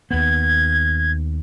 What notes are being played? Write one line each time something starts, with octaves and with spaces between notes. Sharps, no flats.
D#2 B3 G#6